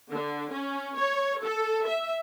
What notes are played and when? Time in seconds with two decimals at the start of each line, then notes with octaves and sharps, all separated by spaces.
0.11 D3
0.51 C#4
0.96 C#5
1.42 A4
1.86 E5